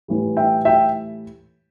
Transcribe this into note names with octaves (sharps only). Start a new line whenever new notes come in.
A2 E3 G3
E5 G5
E5 G5